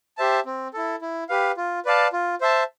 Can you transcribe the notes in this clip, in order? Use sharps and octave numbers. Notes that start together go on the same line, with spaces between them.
G4 C5 E5 A5
C4
E4 A4
E4
G4 B4 F5
F4
B4 D5 F5 A5
F4
C5 E5 A5